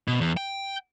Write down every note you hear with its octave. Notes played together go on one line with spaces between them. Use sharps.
B2
E2
G5